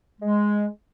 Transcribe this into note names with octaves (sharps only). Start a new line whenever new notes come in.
G#3